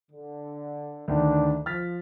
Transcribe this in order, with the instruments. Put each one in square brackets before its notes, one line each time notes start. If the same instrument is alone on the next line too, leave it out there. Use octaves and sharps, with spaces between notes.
[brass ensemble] D3
[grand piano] D2 D#3 [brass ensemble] D4
[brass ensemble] F3 [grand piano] F6 A6 B6